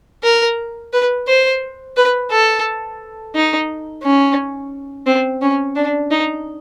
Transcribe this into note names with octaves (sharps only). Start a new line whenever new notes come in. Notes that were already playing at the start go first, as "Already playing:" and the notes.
A#4
B4
C5
B4
A4
D#4
C#4
C4
C#4
D4
D#4